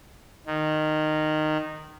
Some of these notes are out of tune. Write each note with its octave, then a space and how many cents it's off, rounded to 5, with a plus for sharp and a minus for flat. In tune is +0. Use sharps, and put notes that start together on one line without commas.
D#3 -15